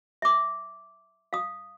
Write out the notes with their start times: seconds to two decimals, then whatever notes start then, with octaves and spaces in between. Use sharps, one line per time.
0.22 E5 D6
1.33 F5 D#6